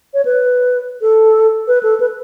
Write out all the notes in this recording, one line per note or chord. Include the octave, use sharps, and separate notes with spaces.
C#5
B4
A4
B4
A4
B4